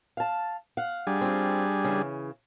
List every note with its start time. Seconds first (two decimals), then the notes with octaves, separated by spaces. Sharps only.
0.17 F5 A5
0.77 F5 F#5
1.07 G3 D4 G#4
1.21 C4 F4
1.84 C#3 E3